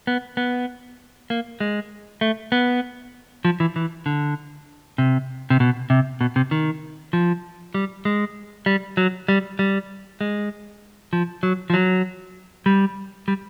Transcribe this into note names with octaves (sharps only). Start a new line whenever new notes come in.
B3
B3
A#3
G#3
A3
B3
F3
E3
E3
D3
C3
C3
B2
C3
B2
C3
D#3
F3
G3
G#3
G3
F#3
G3
G3
G#3
F3
F#3
F3
F#3
G3
G3